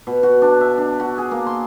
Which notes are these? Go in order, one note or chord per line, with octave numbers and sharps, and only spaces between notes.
B2
F#4
D4
E5
D4
F#4
G#4
A#3
C6